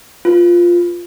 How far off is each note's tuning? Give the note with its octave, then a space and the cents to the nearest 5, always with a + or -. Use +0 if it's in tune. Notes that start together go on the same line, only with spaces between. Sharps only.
F4 +0 B4 -15